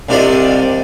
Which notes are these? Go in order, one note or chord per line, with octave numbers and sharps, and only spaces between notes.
C2 C3 D4 F4 D5 D#5